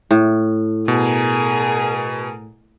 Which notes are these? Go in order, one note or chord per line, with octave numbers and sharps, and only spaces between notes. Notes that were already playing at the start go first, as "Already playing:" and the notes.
A2
B2 G#4 A#4